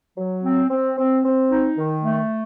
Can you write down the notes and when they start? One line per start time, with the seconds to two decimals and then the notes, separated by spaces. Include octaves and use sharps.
0.16 F#3
0.43 C4
0.69 C4
0.97 C4
1.23 C4
1.50 D#4
1.77 D#3
2.03 A3